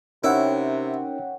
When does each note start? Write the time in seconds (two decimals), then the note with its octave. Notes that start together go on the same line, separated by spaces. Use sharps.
0.24 C3 C#4 D#4 E4 A#4 C#5 F#5 G5